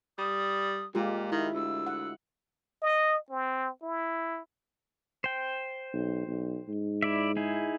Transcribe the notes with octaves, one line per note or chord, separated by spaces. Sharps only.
G3 D#6
A#2 G#3 F4 G4 A#5
D#3 E4
D2 E6
F#5
D#5
C4
E4
C5 G5
B1
B1
G#2
E4 D5 E5
D#4 E4 G#4